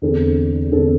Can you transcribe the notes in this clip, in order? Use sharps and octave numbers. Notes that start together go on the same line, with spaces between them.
E2 D3 C4 A4
E2 D3 C4 A4